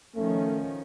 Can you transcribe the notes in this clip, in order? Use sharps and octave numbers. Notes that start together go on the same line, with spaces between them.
D#3 F3 A3 C#4